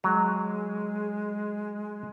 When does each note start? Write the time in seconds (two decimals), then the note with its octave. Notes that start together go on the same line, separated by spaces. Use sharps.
0.04 F#3 G#3